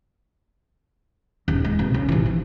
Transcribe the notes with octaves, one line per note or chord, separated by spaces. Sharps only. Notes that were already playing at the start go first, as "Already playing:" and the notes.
D#1 E2
G#3
C2 B2
C#3
A1 E3
F3